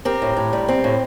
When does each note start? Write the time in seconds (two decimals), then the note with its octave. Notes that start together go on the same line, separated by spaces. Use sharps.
0.05 C4 G4 A#4
0.22 A2
0.37 A2
0.53 G3
0.69 C4
0.84 A2